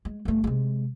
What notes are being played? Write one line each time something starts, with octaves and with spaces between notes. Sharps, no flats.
G#3
G1 A3
C3 G#3